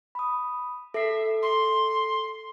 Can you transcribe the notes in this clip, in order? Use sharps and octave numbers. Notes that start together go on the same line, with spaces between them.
B5 D#6
A4 E5 C7
C6